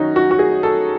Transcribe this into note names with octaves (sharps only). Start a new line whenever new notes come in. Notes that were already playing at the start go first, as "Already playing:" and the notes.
Already playing: F#2 D#3 C#4 D#4 F#4
F#4
F#4
G#4
A4